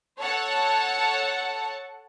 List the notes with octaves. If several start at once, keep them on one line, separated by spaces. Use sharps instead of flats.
A4 C#5 F#5 A5